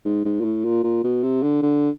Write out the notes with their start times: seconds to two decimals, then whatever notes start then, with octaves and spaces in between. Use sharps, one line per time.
0.05 G#2
0.25 G#2
0.40 A#2
0.44 A2
0.65 A#2
0.84 A#2
1.04 B2
1.23 C3
1.43 D3
1.62 D3